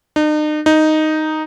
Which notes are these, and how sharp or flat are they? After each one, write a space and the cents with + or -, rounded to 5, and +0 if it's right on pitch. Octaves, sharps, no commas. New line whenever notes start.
D#4 -40
D#4 +0